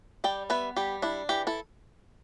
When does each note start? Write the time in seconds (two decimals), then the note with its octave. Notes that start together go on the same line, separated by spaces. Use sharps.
0.24 G3 D5 G5
0.50 B3 B4 E5
0.77 G3 G4
1.02 D4 E4
1.29 E3 G4
1.47 E4 A4